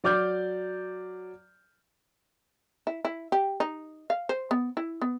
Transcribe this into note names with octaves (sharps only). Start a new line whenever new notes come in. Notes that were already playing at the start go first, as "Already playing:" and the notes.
F#3 D5 D6 F6 G6
E4
E4
G4
D#4
F5
C5
B3
E4
B3